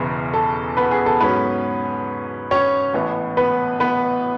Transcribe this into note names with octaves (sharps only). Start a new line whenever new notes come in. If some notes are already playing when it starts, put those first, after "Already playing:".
Already playing: E1 E2 C#3 E3
A4
B3 B4
G#4
A4
G#2 F#3 B3 C#4 B4
C#4 C#5
A1 A2 E3 B3
B3 B4
B3 B4